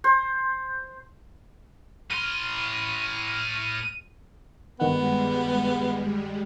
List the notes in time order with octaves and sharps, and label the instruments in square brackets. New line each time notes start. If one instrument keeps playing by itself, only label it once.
[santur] C5
[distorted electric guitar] A2 C6 [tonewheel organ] F6 [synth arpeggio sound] D#7
[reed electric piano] G2 D#3 F#5 [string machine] G3 G#3 [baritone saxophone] B3